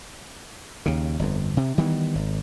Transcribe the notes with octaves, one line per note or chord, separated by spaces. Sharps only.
D#2 C#3
G1 F2
C3
D#3 E3 G3 B3
G#1